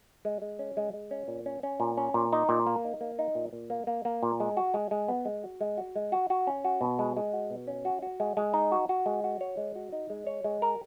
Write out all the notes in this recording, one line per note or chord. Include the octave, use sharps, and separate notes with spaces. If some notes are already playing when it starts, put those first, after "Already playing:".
G#3
G#3
C#4
G#3
G#3
C#4
A#2
C#4
C#4
A#2
C#4
A#2
D#4
A#2
A#3
D#4
A#3
D#4
A#2
A#2
A#3
A#3
A#3
A#2
G#3
F#4
G#3
G#3
B3
G#3
F#4
G#3
F#4
G#3
F#4
F#4
C#4
F#4
B2
G#3
G#3
F#4
B2
C#4
F#4
F#4
G#3
G#3
D#4
F#4
F#4
G#3
F#4
C#5
G#3
F#4
D#4
G#3
C#5
G#3
A#4